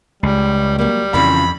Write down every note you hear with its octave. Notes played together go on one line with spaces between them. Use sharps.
C#2 G3
F#3 G3 A#3
F2 C#3 E3 F3 B5